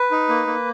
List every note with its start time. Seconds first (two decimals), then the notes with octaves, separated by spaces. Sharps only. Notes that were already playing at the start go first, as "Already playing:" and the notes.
Already playing: B4
0.11 D#4
0.29 A#3
0.47 A#3